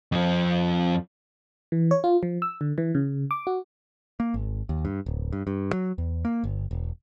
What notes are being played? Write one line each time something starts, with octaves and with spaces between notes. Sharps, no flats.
F2 F3
E3
C#5
F4
F3
E6
D3
E3
C#3
D6
F#4
A#3
G#1
D#2
G2
D1
G2
G2
F#3
E2
A#3
G1
E1